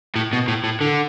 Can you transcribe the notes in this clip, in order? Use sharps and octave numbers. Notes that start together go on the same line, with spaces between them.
A2
B2
A2
A2
D3